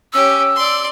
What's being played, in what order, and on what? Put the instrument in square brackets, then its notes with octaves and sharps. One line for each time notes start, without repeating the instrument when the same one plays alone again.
[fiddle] C#4 G4 [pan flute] E6
[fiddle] D5 C6